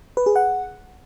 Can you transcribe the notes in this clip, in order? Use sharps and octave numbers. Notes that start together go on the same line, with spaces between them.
B4
G#4
F#5